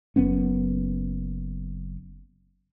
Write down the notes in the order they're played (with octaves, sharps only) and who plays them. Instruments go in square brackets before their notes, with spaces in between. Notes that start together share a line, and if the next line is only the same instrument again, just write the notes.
[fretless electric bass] F#1 F#2 B3 C#4